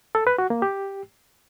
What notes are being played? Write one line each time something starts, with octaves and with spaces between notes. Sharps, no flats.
A4
B4
F#4
A#3
G4